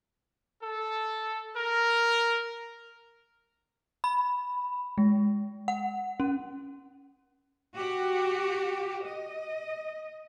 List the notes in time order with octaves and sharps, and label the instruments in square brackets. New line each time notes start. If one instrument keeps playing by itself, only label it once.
[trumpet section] A4
A#4
[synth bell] B5
G#3
F#5
C#4
[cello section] F#4 G4
D#5